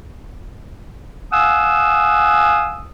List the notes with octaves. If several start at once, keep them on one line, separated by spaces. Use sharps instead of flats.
F5 F#5 G#5 D#6 E6